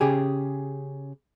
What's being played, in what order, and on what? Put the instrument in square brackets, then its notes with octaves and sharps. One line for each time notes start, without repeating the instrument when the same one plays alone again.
[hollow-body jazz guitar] C#3 G4 G#4